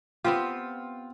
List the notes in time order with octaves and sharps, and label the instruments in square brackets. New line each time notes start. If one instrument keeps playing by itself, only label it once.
[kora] B3 C4 G4 [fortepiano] F4